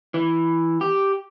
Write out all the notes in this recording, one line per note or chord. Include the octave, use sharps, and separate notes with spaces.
E3
G4